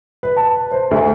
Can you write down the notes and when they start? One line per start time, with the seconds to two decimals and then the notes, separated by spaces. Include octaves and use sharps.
0.23 B4
0.36 A5
0.72 C5
0.91 D2